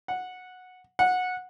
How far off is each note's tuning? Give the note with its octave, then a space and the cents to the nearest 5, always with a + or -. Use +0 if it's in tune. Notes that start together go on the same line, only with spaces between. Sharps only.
F#5 -10
F#5 -15